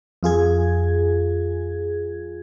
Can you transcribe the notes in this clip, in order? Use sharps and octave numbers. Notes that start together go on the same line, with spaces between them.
F2 F4 G#4 G#6